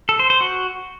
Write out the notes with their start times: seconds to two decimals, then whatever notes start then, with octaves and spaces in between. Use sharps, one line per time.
0.09 A4
0.19 C5
0.30 C5
0.41 F#4